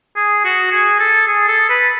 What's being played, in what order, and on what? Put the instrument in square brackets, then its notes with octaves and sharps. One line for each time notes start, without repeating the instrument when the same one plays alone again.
[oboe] G#4
F#4
G#4
A4
G#4
A4
B4